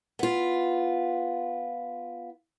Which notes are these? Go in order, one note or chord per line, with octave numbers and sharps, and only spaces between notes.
B3 F4